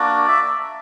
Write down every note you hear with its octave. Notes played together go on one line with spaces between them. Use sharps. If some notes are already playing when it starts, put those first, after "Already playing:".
Already playing: A#3 D4 F#4 D5
E5